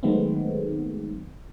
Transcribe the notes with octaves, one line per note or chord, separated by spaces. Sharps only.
D#3 F#3 G#3 A3 B3 C4